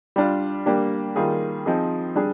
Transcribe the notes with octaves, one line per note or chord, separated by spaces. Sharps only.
G3 D4 F4
G3 A#3 D4 G4
D#3 G3 A#3 F4 G#4
F3 C4 D#4 G#4
G3 D4 G#4